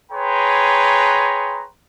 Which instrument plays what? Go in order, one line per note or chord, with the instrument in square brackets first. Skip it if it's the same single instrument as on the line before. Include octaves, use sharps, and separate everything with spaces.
[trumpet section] G#4 B4 C#5 G5 A#5 C6